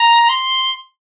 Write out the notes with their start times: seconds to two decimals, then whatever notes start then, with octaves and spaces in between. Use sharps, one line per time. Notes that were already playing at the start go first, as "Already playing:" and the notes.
Already playing: A#5
0.29 C6